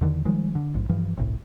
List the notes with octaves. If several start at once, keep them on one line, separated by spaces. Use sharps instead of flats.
E2 D3 D#3
D#3 F3 G3 G#3
D3
A#1 G#2
G2 E3 F3
G1 C2 A2